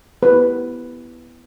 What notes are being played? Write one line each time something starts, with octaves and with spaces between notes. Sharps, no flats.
B3 E4 G4 B4